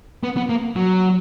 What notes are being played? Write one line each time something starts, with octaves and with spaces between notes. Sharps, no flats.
B3
B3
A#3
F#3